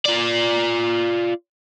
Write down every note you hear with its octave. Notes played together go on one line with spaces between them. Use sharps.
F4 D5